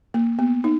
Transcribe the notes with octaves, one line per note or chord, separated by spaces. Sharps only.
A#3
B3
D#4